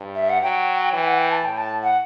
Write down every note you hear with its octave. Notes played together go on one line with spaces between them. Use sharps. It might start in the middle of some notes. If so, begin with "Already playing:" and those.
Already playing: G2
E5
F#5
F#3 G5
E3 G5
F#5
G5
A5
A2 G5
A5
F#5